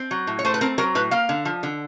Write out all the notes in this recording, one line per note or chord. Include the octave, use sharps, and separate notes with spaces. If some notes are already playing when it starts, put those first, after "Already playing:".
Already playing: C4
F#3
A2
C#5
A3 C5
B4
C4 A#4
F#3 A#4
A2 B4
A#3 F5
D3
F3
D3